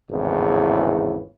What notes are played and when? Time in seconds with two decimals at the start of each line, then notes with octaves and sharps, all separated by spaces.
0.11 G#1 E2 A2 C#3